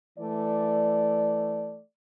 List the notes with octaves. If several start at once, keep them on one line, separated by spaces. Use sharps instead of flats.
E3 A3 D5